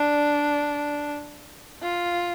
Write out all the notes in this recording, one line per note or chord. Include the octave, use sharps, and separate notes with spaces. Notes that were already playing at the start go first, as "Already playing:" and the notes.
Already playing: D4
F4